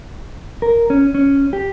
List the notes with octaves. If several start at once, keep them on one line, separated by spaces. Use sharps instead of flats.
A#4
C#4
C#4
G4